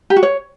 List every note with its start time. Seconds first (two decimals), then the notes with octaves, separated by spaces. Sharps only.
0.10 G4
0.16 F#4
0.23 C#5